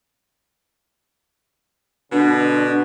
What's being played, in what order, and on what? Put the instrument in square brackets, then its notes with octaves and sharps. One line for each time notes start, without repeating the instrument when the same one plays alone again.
[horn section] B2 D3 [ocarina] D4